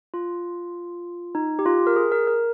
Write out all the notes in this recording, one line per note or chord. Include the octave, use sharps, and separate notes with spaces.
F4
D#4
G4
F4
A#4
G#4
A#4
A#4